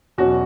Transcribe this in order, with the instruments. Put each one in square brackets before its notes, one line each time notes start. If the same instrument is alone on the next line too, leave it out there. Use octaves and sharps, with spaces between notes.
[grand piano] E2 B2 F#3 C#4 [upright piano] F#4